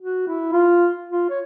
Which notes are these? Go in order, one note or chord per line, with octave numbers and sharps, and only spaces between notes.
F#4
E4
F4
F4
C#5